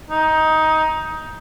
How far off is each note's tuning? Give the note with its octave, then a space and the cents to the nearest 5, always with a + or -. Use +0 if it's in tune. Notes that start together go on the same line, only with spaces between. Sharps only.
D#4 +15